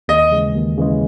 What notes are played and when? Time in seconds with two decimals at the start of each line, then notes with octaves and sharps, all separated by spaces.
0.08 D#2 D#5
0.31 C#3 E3 G#3
0.54 D#2
0.77 C#3 E3 G#3